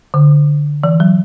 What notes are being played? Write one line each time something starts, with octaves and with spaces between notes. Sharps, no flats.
D3
E3
F#3